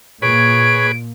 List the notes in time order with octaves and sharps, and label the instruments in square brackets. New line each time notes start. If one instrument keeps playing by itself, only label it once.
[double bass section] A#2 [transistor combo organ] G#4 B4 [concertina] C#5 [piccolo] D7